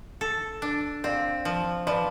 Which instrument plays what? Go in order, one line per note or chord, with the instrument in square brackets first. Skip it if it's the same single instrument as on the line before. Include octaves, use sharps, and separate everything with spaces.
[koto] A4
D4
[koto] C4 [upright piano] D5 F5
[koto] F3
[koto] F3 [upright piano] B4 D5